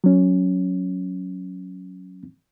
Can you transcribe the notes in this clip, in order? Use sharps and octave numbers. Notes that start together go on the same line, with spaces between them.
F#3 C#4